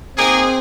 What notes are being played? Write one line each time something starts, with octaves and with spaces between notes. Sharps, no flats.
A#3 C4 D#4 G#4